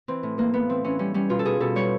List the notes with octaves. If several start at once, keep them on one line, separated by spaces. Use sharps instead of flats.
E3 C4
A2
E3 A#3
E3 B3
E3 C4
E3 C#4
G3 C#4
G3 C#4
B2 F4
A4
B2 G#4
B2 A4
G3 C#5